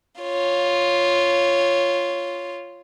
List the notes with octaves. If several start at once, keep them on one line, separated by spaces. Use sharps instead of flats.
F4 C#5